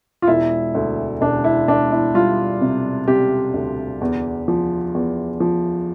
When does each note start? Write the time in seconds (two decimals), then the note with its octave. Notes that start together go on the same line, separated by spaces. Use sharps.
0.22 F4
0.27 E1 E4
0.75 D2
1.21 E1 D4
1.44 E4
1.68 E1 D4
1.92 E4
2.14 G3 F4
2.61 C3
3.07 C3 G4
3.54 D2
4.01 E2
4.48 F3
4.95 E2
5.40 F3